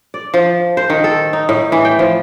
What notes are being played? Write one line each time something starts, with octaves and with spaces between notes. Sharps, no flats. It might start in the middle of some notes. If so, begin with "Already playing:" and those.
D5
F3
C5
D#3
A4
D#4
A2
E3
G5
F3